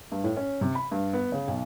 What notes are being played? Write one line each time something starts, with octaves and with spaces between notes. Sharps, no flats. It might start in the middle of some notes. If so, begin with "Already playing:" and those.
G2
A2
C#4
C3
B5
G2
B3
C#3
B1